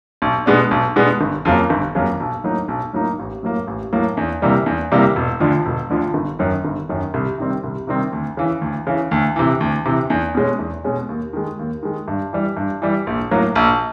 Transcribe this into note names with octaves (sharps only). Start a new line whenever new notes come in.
B1
B2 G#3 B3 D4
B1
B2 G#3 B3 D4
G1
F2 C#3 F#3 A#3
G1
F2 C#3 F#3 A#3
B1
A2 F#3 A#3 D#4
B1
A2 F#3 A#3 D#4
A1
A2 F#3 A#3
A1
A2 F#3 A#3
E2
C3 E3 G3 A#3
E2
C3 E3 G3 A#3
E1
D2 D3 F3
E1
D2 D3 F3
G1
F#2 D#3 F#3
G1
F#2 D#3 F#3
C2
C3 D#3 G3 C4
C2
C3 D#3 G3 C4
D2
C#3 E3
D2
C#3 E3
D2
C3 E3
D2
C3 E3
E2
B2 G#3 C#4
E2
B2 G#3 C#4
D#2
D#3 G#3
D#2
D#3 G#3
G2
E3 G3
G2
E3 G3
A#1
A2 F#3 A#3
A#1